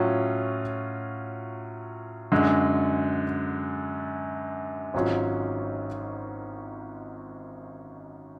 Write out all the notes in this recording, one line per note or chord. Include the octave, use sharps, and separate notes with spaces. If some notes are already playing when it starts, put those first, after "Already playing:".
Already playing: A2 F#3 C#4 F4
F#2 D3 G#3
G#1 G#2 F#3 C#4 F4